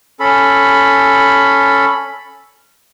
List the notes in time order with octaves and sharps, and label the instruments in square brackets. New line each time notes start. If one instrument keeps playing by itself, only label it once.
[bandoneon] C#4 A4 B5